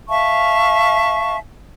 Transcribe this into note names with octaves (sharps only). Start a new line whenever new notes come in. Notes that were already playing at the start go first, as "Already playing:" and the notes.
E5 F5 A5 C#6